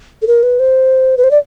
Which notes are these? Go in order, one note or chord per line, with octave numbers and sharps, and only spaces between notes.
A4
A#4
B4
C5
B4
C5
D5